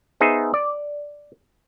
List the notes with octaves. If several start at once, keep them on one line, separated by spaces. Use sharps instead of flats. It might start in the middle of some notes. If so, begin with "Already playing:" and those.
B3 D#4 G#4 C5 E5
D5